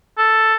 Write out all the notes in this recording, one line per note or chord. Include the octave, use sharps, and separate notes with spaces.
A4